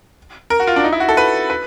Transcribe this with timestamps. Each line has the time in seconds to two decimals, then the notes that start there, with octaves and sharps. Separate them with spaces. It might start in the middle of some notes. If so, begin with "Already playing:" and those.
0.50 A#4
0.60 F#4
0.67 F4
0.76 D4
0.84 D#4
0.93 E4
1.00 F#4
1.09 A4
1.17 B4
1.50 B4